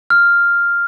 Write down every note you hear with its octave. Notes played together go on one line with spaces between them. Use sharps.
F6